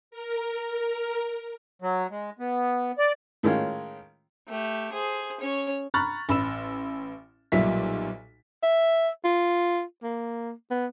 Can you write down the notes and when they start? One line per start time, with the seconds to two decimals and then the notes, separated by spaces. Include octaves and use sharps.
0.11 A#4
1.82 F#3
2.10 G#3
2.39 B3
2.98 D5
3.43 A2 D#3 G#3 C#4 F4
4.48 A3 G4
4.92 G#4 C5
5.40 C#4 C#5
5.94 A#5 B5 C#6 F6 F#6 A6
6.29 A1 B5 E6 E7
7.52 B1 A#2 G3 E5 B6
8.63 E5
9.24 F4
10.03 A#3
10.71 B3